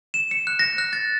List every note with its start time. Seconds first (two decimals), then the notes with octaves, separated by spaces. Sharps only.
0.14 E7
0.31 C#7
0.47 F#6
0.59 A#6
0.78 F#6
0.93 A6